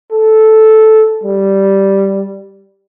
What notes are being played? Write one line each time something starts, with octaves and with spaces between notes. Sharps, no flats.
A4
G3